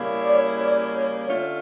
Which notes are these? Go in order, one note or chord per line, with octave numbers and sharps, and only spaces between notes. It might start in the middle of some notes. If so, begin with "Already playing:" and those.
Already playing: C#3 G3 A#3 E4
D5
C#5
C#5
D5
C#5
D3 A3 C#4 F4 C#5